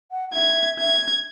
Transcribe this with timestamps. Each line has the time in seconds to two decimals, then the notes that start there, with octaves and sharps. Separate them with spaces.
0.11 F#5
0.29 F#5
0.34 E5 G#6
0.80 G#6